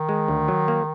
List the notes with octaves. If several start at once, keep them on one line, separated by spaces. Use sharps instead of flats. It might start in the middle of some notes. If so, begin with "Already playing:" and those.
Already playing: D#3
G#3
D2
F#3
A#3